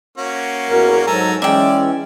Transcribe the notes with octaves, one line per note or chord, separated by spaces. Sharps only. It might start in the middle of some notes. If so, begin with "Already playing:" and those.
A#3 C#4 F#4
E2 F#3 A#4
G#2 F#3 A4 G#5 A#5
E3 G#3 C#4 D5 E5 G5